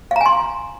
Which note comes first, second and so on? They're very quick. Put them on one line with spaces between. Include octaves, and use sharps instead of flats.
F5 A#5 G#5 C6